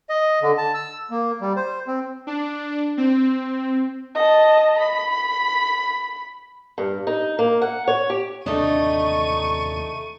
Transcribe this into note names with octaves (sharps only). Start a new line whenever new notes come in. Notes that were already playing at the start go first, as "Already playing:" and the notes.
D#5
D3
A5
E6
A#3
G3
C5
C4
D4
C4
D#5 A5
B5
G2
D#4
A#3
F#5
C#5
G4
D#2 C3 E3 A3 D4 D#4 C#6 D#7